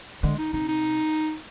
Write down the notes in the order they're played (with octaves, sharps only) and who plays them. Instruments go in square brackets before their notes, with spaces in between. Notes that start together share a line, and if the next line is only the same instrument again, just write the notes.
[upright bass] D3 [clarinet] G#3
[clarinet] D#4
[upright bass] C3 [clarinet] D#4
[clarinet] D#4